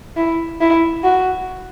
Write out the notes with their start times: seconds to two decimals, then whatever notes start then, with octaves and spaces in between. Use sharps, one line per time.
0.17 E4
0.61 E4
1.04 F#4